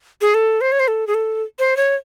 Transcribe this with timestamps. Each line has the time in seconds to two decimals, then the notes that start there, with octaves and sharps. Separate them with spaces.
0.21 G#4
0.34 A4
0.61 C5
0.72 C#5
0.80 C5
0.88 A4
1.07 G#4
1.14 A4
1.59 C5
1.77 C#5